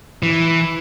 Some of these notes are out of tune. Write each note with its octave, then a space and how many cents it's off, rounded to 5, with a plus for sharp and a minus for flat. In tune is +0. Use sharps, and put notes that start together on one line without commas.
E3 +0